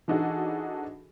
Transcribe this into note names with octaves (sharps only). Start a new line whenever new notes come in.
E3 D4 D#4 F#4 G#4 A4